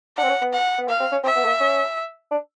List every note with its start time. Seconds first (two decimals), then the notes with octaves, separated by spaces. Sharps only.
0.17 D4 F#5
0.23 C4
0.29 C#4
0.42 B3
0.53 F#5
0.79 B3
0.88 A#3 F5
1.00 C4
1.12 C#4
1.24 C4 E5
1.36 B3
1.44 A3
1.48 A#3
1.60 C#4
2.31 D4